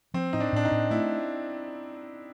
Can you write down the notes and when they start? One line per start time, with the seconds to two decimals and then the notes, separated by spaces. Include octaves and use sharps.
0.14 F3 C4
0.33 A2 D#4
0.40 D4
0.53 A2 D4
0.65 D#4
0.71 A2
0.91 A3 E4